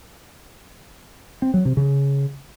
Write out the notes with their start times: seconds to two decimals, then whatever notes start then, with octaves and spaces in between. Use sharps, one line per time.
1.42 C4
1.54 F#3
1.65 C3
1.77 C#3